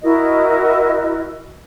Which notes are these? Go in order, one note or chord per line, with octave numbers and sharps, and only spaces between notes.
E4 F#4 A#4 D#5